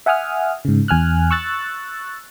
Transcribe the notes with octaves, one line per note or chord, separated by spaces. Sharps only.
E5 F#5 G#5 D#6 F6
G#2 C#3
E2 G#5 F6 F#6
C#6 E6 F#6 A6